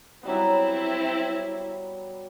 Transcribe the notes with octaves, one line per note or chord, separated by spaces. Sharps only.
F#3 G3 B3 C4 E4